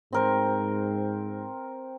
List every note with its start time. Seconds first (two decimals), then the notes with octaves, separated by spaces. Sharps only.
0.13 G#2 C4 A#4 C5